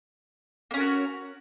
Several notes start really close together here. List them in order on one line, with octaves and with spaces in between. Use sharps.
A#3 C#4 A#4 F#4